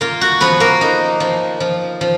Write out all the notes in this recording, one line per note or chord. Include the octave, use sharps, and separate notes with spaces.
A#3 F4
F#4
F3 B3 B4
A#3 A#4
D#4
F3
F3
F3